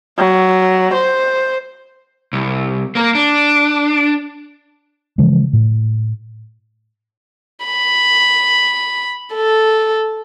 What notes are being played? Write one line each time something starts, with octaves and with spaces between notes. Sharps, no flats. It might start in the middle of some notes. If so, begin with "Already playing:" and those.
F#3
C5
C2
A#3 A#4
D4
C#3 E3 F3 G#3
A2
B5
A4